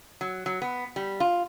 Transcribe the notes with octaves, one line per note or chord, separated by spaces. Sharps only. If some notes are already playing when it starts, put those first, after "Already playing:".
F#3
F#3
B3
G3
F4